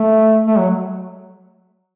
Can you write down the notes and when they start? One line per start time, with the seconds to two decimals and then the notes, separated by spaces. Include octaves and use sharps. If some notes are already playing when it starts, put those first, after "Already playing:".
Already playing: A3
0.47 A3
0.58 F#3